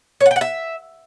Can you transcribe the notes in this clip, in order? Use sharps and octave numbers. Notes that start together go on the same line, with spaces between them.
C#5
F#5
G5
F#5
E5